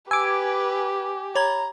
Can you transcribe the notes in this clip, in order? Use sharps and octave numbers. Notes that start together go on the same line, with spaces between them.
G4 B4 G#5 D6 E6
C#5 A#5 B5 G#6